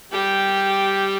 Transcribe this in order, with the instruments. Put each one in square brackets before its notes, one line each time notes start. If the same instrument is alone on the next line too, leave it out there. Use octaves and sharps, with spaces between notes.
[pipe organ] G3 [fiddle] G4